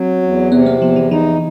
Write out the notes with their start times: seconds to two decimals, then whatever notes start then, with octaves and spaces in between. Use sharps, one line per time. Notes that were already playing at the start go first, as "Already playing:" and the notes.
Already playing: F#3 C4
0.22 E2
0.52 C3 B3
0.66 A#3
0.81 E2 F3
0.96 E3
1.11 E3 D#4